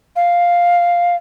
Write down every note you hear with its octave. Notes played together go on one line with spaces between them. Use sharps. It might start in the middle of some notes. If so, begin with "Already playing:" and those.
F5